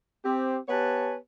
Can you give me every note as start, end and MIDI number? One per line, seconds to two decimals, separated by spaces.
0.25 0.57 60
0.25 0.57 67
0.68 1.16 59
0.68 1.16 67
0.68 1.16 71
0.68 1.16 73
0.68 1.16 80
0.68 1.16 81